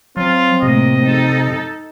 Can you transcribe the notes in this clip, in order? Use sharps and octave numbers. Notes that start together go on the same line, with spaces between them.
F#3 C4 F4
A2 C3 A#3 D#5
D#4 A4